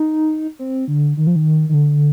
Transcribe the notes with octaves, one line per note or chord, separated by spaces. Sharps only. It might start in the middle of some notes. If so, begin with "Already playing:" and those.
Already playing: D#4
C4
D3
D#3
F3
D#3
D#3
D3